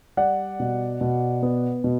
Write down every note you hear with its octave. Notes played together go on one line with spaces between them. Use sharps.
G3 D5 F#5
B2
B2
B3
B2